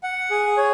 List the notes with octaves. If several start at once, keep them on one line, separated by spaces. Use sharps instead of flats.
F#5
G#4
C#5